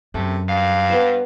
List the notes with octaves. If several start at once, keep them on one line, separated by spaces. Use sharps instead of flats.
F#2 C3 A3
G2 F5
B3 C5